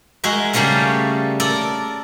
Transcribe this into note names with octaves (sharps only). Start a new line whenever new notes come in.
G#3 F#4 A#4 E5
C#3 G3 A3 A#3 C#4 A#4
A4 A#4 D5